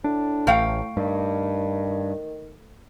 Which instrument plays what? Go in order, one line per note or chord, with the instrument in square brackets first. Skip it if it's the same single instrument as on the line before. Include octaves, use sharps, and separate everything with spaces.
[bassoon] A2 [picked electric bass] D4
[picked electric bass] A1 [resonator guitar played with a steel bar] A3 F5 G5
[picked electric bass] G2 [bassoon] D#3